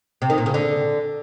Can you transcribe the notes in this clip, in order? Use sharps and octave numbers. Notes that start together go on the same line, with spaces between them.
C3
D#3
A#2
C#3
D3